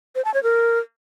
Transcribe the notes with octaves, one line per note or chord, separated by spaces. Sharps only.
C5
A5
C#5
A#4